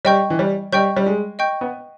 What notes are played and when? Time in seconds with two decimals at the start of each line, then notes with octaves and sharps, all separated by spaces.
0.05 G3 D#5 G5 C#6 G6
0.30 E3
0.39 G3
0.72 G3 D#5 G5 C#6 G6
0.96 G3
1.06 G#3
1.39 D#5 G5 C#6 G6
1.61 B3